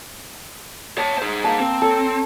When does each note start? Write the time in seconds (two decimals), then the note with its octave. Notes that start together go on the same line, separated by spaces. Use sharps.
0.98 C#5 A5
1.18 G#4 C5
1.44 A#3 A5
1.60 C4
1.82 A4 C#5